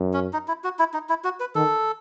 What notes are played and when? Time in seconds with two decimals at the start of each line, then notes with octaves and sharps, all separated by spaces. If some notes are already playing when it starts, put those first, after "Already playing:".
Already playing: F#2
0.14 C#4
0.33 D#4
0.48 E4
0.64 F#4
0.79 E4
0.94 D#4
1.09 E4
1.24 F#4
1.40 B4
1.55 D#3 A4